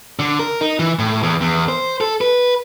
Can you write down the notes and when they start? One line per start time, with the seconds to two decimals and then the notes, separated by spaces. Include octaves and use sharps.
0.19 D3
0.39 A#4
0.61 D#4
0.79 E3
0.99 A2
1.23 E2
1.41 E2
1.69 C5
2.01 A4
2.21 B4